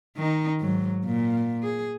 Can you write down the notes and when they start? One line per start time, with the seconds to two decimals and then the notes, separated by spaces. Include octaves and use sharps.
0.17 D#3 D#4
0.60 G#2 F#3
1.05 A#2
1.63 G#4